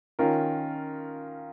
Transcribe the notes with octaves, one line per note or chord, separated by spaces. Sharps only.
D#3 C#4 F4 A#4